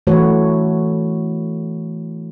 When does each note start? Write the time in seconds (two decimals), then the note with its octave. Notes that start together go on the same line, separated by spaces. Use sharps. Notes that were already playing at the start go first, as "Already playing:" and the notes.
0.07 E3 A3 F#4 B4 C#5